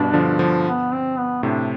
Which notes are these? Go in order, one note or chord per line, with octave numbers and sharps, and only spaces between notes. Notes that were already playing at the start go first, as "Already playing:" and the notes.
Already playing: G2 B2 D4
D3 F3
D3 F3
B3
C4
B3
A2 C3 D4